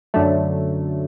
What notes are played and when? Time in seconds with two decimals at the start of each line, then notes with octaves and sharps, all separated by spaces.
0.14 F#2 D3 F#3 A3